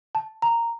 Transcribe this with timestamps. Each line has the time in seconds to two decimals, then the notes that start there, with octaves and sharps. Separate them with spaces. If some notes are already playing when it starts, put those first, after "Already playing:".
0.15 A5
0.42 A#5